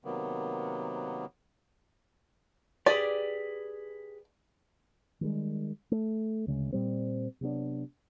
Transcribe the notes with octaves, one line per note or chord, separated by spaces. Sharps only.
C3 D#3 F#3 A#3 B3
G4 G#4 B4 D5
D#3 G3 G#3
A3
D2 C#3 G#3
A#2 G3 C4
C3 F#3 B3 D4